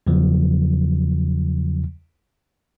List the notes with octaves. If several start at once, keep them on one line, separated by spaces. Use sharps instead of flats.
E2 C#3 F3 F#3